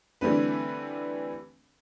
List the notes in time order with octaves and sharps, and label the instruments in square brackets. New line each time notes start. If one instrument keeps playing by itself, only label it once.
[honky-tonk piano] D3 E3 G3 A3 C4 B4